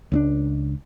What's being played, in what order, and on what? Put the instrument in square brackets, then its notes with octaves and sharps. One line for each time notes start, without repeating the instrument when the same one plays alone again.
[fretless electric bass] C#2 C4 D4